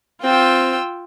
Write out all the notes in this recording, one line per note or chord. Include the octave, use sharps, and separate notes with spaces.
C4 F4 G5 E6